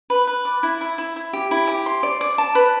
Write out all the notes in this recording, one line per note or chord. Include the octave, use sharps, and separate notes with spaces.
B4
B4
D5
E4
E4
E4
E4
G4
E4
G4
C6
D5
D5
A5
B4